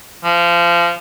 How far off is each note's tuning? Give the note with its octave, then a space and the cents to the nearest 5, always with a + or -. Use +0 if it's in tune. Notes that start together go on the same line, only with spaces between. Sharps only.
F3 -25